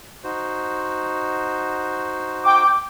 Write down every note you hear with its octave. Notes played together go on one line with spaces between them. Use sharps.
D#4 F#4 C5
G5 D6